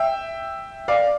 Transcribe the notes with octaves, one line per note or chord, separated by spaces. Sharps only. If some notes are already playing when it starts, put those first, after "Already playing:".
Already playing: E5 G5
D5 F5